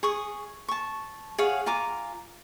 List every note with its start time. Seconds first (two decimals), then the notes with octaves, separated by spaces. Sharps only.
0.03 G#4 C#6 D#6
0.68 A5 C#6
1.38 G#4 C#5 F5 F#5
1.66 F4 G#5 A#5 D6